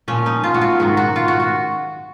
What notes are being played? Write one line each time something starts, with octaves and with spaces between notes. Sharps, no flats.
A#2 F3 C#4
D#4
F4
F#4
F4
G#2 D#3 F#3 F#4
F#4
F4
F#4
F#4